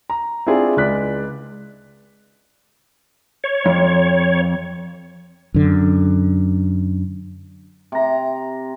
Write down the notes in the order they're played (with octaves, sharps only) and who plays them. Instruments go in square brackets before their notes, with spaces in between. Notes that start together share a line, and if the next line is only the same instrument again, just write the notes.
[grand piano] A#5
C4 D4 E4 F4 G#4
C#2 G#3 D5 F#6 B6
[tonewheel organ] C#5
[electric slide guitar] F2
[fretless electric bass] F#2 D3
[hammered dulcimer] C3 A#5